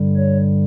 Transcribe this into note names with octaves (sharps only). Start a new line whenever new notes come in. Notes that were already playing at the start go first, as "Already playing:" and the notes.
Already playing: G2 D3 G3
C#5